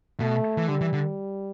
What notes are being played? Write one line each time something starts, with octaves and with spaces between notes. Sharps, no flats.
B2 A3
E3
D3 G3
E3
D3